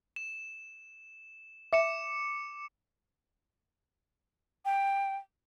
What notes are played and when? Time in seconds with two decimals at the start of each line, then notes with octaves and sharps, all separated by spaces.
0.16 E7
1.73 E5 D6 C#7 E7
4.65 G5